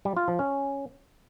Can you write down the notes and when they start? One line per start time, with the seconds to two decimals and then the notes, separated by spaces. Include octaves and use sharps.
0.05 G3
0.17 F4
0.28 F3
0.39 C#4